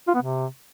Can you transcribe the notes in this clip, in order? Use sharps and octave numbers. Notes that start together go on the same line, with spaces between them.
F4
B3
C3